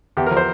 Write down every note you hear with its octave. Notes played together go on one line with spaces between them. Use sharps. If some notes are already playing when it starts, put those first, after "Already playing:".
E2 G4
A#4
F3
C5